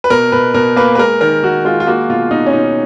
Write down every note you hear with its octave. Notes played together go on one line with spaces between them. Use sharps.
B4
B2 A#4
B2 B4
B2 A#4
A#3 B4
B4
G#3 A#4
D#3 A#4
D#3 F#4
G#3 F4
F4
A#3 F#4
B2 F4
B2 D#4
C#4
B2 D#4